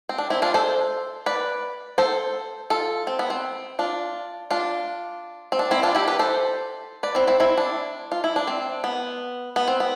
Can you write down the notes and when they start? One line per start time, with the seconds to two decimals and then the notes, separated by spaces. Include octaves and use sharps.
0.09 C4
0.18 D4
0.30 C4 E4
0.42 D4 F4
0.54 A4 C5
1.26 B4 D5
1.98 A4 C5
2.70 F4 A4
3.07 C4
3.19 B3
3.30 C4
3.79 D4 F4
4.51 D4 F4
5.52 C4
5.59 D4
5.71 C4 E4
5.83 D4 F4
5.95 E4 G4
6.08 G4 B4
6.19 A4 C5
7.03 B4 D5
7.15 C4 E4
7.27 C4 E4
7.40 C4 E4
7.58 D4
8.12 F4
8.24 E4
8.36 D4
8.47 C4
8.84 B3
9.56 B3
9.68 C4
9.80 B3